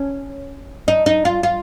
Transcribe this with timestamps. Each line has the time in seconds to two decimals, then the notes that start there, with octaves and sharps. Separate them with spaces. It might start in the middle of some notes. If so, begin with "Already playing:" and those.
Already playing: C#4
0.88 D#4
1.06 D#4
1.25 F4
1.43 F4